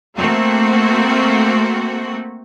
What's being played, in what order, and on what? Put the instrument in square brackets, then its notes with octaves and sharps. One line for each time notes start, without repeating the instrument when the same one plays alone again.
[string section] A3 A#3 C4 F#4